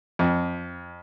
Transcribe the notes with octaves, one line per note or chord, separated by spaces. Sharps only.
F2